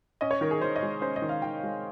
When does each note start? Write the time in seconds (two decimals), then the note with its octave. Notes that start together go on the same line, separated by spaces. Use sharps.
0.21 C#4 D#5
0.31 C#5
0.41 D#3 A#4
0.51 G#4
0.61 D#3 C5
0.76 D#5
0.82 G#3
1.02 C#4 C5
1.16 D#5
1.22 D#3
1.29 F5
1.42 D#3 G5
1.63 G#3